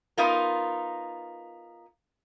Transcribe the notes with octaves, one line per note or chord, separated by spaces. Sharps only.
B3 D#4 F4 A#4